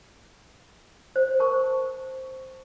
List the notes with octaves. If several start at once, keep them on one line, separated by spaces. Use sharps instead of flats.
C5
A#4 A5 C#6